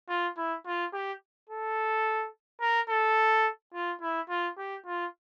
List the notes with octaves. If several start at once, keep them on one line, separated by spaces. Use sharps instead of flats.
F4
E4
F4
G4
A4
A#4
A4
F4
E4
F4
G4
F4